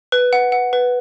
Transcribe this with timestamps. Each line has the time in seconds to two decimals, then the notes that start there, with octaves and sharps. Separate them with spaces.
0.12 B4
0.33 F#5
0.52 F#5
0.73 B4